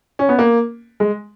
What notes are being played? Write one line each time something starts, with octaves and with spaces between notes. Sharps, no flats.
C#4
B3
A#3
G#3